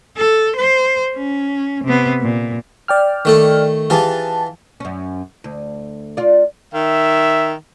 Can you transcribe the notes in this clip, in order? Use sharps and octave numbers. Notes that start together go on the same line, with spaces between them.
A4
C5
C#4
C3 B3
A#2
D5 G5 F6
D#3 A3 A4
E3 F4 G4 G#4 A5
F#2 C#4
D2
F4 D5
D#3 E5